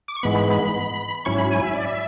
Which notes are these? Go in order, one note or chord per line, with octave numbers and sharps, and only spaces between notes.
D6
C#6
G#2 E3 G#3 B3 B5
G#2 F#3 C#4 E4 C#6
B5
G#5
E5
D5
E5